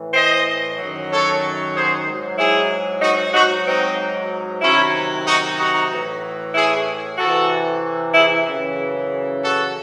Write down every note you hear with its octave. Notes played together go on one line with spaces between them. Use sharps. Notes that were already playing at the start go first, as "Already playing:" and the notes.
Already playing: A2 E3
C5 D#5
F#2 D#3 F#3
A4 C#5
G#4 C5
G#2 F#3
E4 G#4
D#4 F#4
G#2 F#3 D#4 F#4
C4 D#4
C3 D#3 F#3 C#4 E4
D#4 F#4
D#4 F#4
A2 E3
E4 G#4
C3 E3 F#4 A4
E4 G#4
F#2 C#3 E3
F#4 A4